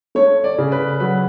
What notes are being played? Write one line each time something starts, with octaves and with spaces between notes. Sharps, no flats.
A3 C#5
D5
C#3
B4
F#3 B4